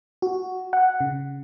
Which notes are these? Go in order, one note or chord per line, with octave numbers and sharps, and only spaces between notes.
F#4
F#5
C#3